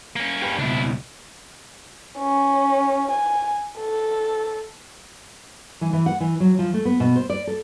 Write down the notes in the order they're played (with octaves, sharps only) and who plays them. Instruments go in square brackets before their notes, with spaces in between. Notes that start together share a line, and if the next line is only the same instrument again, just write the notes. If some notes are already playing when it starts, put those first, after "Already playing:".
[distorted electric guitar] A#3 C#4
[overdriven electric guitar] G4 B4
[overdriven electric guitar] C#2 B2 [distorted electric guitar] D4 E4
[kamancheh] C#4
G#5
A4
[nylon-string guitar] E3
E3
F#5
E3
F#3
F3
A3
B3
B2
C5
D5
A4